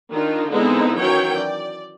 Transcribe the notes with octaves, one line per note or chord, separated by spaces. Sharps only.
D#3 D4 D#4 F4
D3 G#3 B3 C4 D#4 E4
D#3 E3 F#3 C#4 C#5 G5
D5